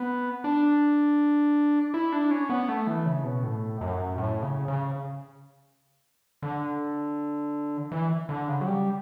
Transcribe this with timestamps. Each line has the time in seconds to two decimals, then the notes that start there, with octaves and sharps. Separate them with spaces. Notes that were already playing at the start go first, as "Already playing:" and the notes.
Already playing: B3
0.44 D4
1.94 E4
2.12 D4
2.31 C#4
2.50 B3
2.69 A3
2.87 E3
3.06 C#3
3.24 B2
3.43 A2
3.81 F#2
4.18 A2
4.43 C#3
4.68 C#3
6.42 D3
7.92 E3
8.29 D3
8.48 C#3
8.61 F#3
8.67 G3